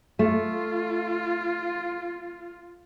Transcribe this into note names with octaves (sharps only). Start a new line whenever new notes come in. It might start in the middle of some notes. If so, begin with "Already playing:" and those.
A3 F4